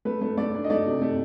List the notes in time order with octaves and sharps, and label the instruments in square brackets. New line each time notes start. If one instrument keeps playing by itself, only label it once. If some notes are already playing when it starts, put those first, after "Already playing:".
[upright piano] A3 B4
A3
A3 D5
D4
D#5
A3 D5
C3
A3